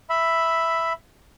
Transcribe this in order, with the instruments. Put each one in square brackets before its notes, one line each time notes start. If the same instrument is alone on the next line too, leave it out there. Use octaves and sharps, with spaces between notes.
[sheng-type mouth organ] E5 B5